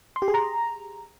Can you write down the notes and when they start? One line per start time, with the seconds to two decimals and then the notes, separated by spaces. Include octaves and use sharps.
0.16 C6
0.22 G4
0.28 G#4
0.34 A#5